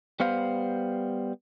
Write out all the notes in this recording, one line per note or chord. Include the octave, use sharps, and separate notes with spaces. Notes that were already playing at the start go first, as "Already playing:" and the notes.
G3 B3 C5 F5